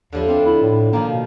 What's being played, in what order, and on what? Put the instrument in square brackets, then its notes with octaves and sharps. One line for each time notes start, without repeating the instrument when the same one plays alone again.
[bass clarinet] D#2 [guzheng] D3 F3 E4
[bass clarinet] C4 [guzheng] D4 F4
[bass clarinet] E4
A2
[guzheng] D#3 F3 [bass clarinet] A#3
[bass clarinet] B2